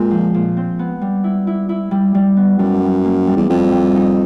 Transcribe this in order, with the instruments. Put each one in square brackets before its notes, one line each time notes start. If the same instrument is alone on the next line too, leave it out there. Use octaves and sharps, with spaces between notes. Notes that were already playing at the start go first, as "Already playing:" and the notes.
Already playing: [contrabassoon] A#2 [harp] G#3 C4
[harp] F3
A#2
C4
B3
G3
E4
E4
E4
G3
G3
B3
[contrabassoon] F#2 [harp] G3
[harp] G3
A#3
G3
[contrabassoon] E2
[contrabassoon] F2 [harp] G3
[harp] G3
D#4